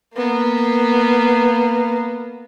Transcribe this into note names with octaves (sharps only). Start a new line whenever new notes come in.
A#3 B3